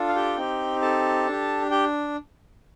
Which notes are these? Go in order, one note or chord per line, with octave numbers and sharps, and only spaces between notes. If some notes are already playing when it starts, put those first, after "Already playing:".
Already playing: D4 F4 A4
F5
G4 G5
C4 D#4 G4
A4 A5
D4 G4
G4 G5